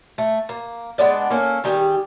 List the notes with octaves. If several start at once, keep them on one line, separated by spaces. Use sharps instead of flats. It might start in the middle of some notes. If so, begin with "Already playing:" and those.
A3
A#3
G#3 B3 D4 D5
A#3 C#4 A4
D#3 G3 G4 G#4